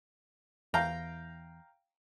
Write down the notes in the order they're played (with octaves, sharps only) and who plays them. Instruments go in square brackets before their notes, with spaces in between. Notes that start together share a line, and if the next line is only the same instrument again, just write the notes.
[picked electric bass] E2 [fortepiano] F5 G5 A#5